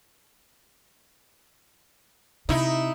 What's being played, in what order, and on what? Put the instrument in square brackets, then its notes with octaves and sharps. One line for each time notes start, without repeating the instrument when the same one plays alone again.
[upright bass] C3 [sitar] D#4 E4